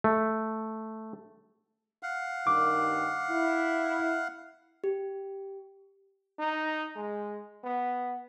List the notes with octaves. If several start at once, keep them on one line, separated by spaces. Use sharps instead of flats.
A3
F5 F#5
G2 D#3 D6
E4
G4
D#4
G#3
B3